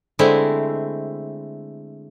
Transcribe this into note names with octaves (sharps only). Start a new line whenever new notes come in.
D3 G#3 A3 C4 E4